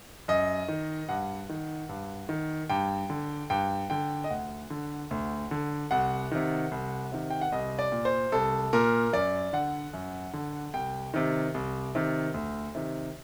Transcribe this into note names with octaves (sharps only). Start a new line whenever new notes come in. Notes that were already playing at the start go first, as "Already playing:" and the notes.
F#2 D#5
D#3
G2 F#5
D#3
G2
D#3
G2 G5
D3
G2 G5
D3 G5
D#5
D2 F#5
D3
D2
D3
C2 F#5
C3 D#3
C2
C3 D#3
G5
F#5
C2 D#5
D5
A#2
C5
C2 A4
A#2 A#4
F#2 D5
D3 F#5
F#2
D3
C2 G5
C3 D#3
C2
C3 D#3
D2
C3 D#3